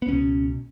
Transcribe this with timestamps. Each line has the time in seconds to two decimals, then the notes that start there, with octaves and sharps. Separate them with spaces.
0.02 B3
0.08 C#2 B2 C#4